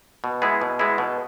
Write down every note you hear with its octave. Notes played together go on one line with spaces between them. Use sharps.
B2
G#3 B3 E4 G#4
B2
G#3 B3 E4 G#4
B2